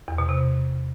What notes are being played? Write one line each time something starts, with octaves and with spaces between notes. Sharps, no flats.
E2
B2
C3